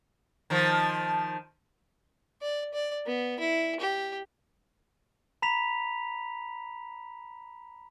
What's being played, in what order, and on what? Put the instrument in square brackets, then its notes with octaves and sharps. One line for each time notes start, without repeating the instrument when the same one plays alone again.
[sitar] D#3 F3
[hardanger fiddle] D5
D5
B3
E4
G4
[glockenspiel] A#5 B5 B6 F7